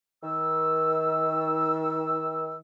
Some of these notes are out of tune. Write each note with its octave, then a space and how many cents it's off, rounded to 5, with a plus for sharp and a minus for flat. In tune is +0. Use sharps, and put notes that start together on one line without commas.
D#3 +35 E6 +0